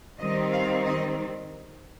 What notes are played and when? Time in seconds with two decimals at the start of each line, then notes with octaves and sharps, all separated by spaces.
0.18 D#3 G3 C4 D#4 D#5
0.51 F5
0.85 D#5